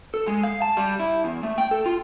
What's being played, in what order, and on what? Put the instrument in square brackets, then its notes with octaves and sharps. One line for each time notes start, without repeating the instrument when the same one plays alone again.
[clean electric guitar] A4
G#3
F5
A5
G3
E4
E2
A3
G5
A4
F4